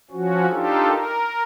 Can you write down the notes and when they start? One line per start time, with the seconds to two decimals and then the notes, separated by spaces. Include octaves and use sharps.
0.11 F3 C#4 F#4
0.50 D4 D#4 F4 G4 A4
0.88 A#4